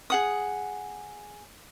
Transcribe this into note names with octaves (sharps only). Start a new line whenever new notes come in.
G#4 F#5 D#6